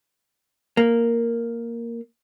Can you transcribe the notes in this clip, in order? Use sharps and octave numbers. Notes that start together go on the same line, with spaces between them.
A#3